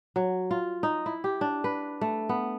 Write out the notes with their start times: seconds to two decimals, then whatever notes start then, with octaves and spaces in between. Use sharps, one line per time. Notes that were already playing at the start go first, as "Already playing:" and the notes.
0.16 F#3
0.51 F4
0.83 D#4
1.06 E4
1.24 G4
1.41 D4
1.64 B4
2.01 A3
2.29 B3